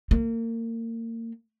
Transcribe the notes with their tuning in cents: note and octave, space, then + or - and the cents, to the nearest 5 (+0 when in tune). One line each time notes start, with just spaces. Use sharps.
A#3 -30